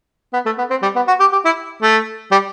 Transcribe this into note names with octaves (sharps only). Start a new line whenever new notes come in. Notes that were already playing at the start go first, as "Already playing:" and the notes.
B3
A3
B3
C4
G3
B3
F#4
G4
G4
E4
A3
G3